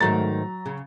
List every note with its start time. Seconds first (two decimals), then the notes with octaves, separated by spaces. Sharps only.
0.01 G#2 D#3 F#3 A3 A#5 A6
0.66 C#3